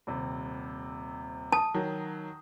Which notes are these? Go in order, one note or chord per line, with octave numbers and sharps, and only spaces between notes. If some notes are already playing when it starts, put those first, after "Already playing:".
D#1 C3
A5 D#6
D#3 F#3